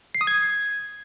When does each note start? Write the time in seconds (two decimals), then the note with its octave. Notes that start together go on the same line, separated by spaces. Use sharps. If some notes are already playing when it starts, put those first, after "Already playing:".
0.15 C7
0.21 D#6
0.27 G#6